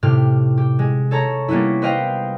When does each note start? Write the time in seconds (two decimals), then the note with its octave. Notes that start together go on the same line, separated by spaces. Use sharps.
0.03 A2 C3 G4 F6
0.57 G4
0.79 G#3
1.11 A4 C#5 A5 A#5
1.48 G3 A#3 B3 C#4 E4
1.82 B4 C5 D#5 F5 G5